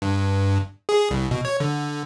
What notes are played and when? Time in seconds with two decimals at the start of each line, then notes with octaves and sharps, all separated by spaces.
0.02 G2
0.89 G#4
1.11 C2
1.31 B2
1.45 C#5
1.60 D3